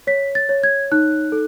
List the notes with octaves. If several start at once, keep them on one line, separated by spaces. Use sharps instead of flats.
C#5 B6
A6
C#5
G#6
D#4 F#6
A4